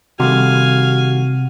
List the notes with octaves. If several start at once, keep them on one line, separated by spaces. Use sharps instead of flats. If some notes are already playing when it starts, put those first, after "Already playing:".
C3 D#3 G3 A3 F#4 F5 G#5